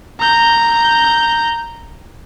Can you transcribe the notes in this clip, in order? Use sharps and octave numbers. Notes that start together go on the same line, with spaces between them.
A#5 G6